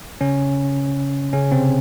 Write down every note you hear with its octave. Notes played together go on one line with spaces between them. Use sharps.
C#3 C#4
C#3 C#4
C3 C4